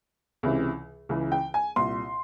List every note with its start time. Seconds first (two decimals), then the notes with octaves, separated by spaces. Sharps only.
0.43 C#2 C3 E3
1.09 C#2 C#3 E3
1.32 G5
1.54 G#5
1.76 C2 A#2 C6